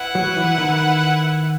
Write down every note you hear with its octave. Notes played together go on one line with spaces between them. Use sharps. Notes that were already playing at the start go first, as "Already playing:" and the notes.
Already playing: E4 B4 F#5
F#3
E3
D#3